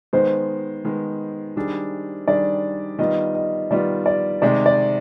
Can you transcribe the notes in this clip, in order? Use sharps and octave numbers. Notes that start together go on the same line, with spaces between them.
D#3 G#3 B3 C5
D#3 G#3 B3
D#3 G3 D4 G#4
D#3 G3 D4 G#4 D5
D#3 G3 B3 F4 D#5
D#5
D#3 G3 B3 F4 D5
D5
C3 D#3 G#3 D5
D5